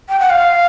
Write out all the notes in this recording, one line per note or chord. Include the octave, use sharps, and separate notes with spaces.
G5
F#5
F5